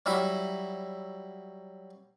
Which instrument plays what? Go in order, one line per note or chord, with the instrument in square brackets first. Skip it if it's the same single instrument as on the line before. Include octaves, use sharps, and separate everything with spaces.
[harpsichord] F#3 G3 E4 E5